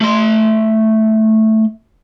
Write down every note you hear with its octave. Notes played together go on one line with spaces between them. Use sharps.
A3 C6